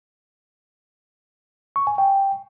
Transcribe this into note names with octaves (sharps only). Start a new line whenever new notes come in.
C#6
G#5
G5